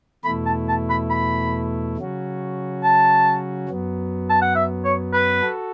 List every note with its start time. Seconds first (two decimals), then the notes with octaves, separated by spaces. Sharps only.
0.25 E2 B2 A3 E4 B5
0.46 A5
0.69 A5
0.90 B5
1.10 B5
1.97 C#3 F#3 C#4 F#4
2.84 A5
3.69 F#2 F#3 B3
4.30 A5
4.42 F#5
4.55 E5
4.85 C#5
5.13 B4
5.42 F#4 A4